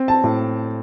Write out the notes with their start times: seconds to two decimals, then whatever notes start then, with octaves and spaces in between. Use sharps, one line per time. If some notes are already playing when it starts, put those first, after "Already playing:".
Already playing: C4
0.08 A5
0.24 A2